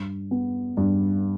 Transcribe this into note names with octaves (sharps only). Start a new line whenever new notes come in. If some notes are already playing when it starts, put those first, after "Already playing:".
Already playing: G2
B3
G2